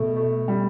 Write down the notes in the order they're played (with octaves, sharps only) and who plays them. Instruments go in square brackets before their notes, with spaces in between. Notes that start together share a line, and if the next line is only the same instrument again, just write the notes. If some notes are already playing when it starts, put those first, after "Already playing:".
Already playing: [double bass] B2 [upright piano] A3
[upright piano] A3
G3